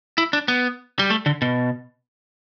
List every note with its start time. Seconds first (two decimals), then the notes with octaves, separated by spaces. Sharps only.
0.18 E4
0.33 D4
0.48 B3
0.99 G3
1.10 A3
1.26 D3
1.42 B2